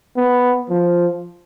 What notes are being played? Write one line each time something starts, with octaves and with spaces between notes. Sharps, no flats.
B3
F3